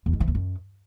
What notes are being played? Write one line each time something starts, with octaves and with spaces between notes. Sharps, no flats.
E2
G#2
E3
E2
F#2